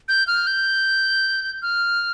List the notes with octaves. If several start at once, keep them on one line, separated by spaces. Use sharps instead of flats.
G6
F6
G6
F6